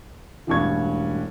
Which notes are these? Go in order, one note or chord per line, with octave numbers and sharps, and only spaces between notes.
E1 A1 G2 C#6 G#6